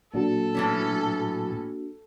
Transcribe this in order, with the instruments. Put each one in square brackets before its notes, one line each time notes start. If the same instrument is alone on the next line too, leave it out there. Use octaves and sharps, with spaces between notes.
[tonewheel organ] A#2 F#3 [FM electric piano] A#3 D4 F#4 [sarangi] A4
[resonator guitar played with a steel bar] A2 E3 C#4